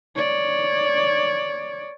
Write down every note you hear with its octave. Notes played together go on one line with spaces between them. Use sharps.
C#5 D5